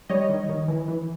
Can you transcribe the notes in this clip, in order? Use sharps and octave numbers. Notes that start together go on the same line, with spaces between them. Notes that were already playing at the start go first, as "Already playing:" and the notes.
G3 C#5 D#5
D#3
D#3
E3
E3